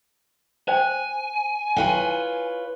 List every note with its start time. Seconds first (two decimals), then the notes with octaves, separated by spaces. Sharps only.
0.68 C5 G5 G#5
1.77 E4 F4 B4 C#5 G5